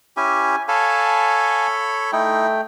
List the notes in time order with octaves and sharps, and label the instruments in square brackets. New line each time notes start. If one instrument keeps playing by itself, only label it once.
[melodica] C#4 E4 G4 [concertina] G#5
[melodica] A4 C#5 B5 [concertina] F5 G#5 A5
[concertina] A3 G5 [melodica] D#4 E4